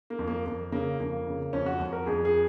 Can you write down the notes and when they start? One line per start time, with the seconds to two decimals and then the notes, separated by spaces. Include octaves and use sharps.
0.10 A#3
0.19 F2
0.28 A#3
0.46 F2 A#3
0.72 C#3 A#3
1.00 F2 A#3
1.27 C#3
1.53 F2 C#4
1.66 F#4
1.80 F2
1.93 A#4
2.06 F2 G#4
2.25 G#4